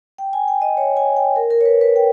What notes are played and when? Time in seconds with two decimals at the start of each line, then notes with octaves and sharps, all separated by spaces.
0.18 G5
0.33 G#5
0.48 G5
0.62 D#5
0.77 C#5
0.97 G#5
1.16 G5
1.36 A#4
1.50 A#4
1.61 C#5
1.65 B4
1.81 B4
1.96 G5